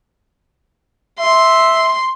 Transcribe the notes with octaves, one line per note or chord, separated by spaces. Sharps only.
E5 C6